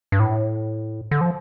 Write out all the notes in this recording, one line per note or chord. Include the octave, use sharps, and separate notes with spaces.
G2
A2
D3
F3